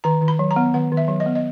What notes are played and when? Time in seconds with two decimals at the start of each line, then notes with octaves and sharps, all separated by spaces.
0.04 D#3 A#5
0.22 D#3
0.28 B5
0.39 F#3
0.51 A#5
0.56 B3
0.74 D#3 F#5
0.92 D#3
0.97 E5
1.08 F#3
1.20 D#5
1.26 B3
1.35 D#5